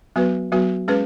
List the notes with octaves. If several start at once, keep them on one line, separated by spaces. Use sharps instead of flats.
F#3 B3 F#4 B4
F#3 B3 F#4 B4
G#3 C#4 G#4 B4